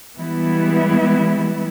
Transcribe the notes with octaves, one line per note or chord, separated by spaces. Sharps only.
E3 G3 G#3 B3 E4